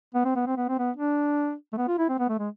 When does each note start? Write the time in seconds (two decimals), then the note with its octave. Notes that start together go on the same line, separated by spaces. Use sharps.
0.15 B3
0.25 C4
0.36 B3
0.47 C4
0.57 B3
0.69 C4
0.79 B3
0.97 D4
1.73 A3
1.77 B3
1.88 F4
1.98 E4
2.09 C4
2.19 B3
2.29 A3
2.38 G#3